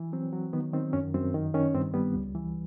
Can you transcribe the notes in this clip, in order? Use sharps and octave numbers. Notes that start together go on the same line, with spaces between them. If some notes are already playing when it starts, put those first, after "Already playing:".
Already playing: E3
F#3 C4
F#3
D#3 B3
D#3 C4
F#2 C#4
F#2 C4
D#3
D#3 C#4
G2 C4
G3 B3
C#2
E3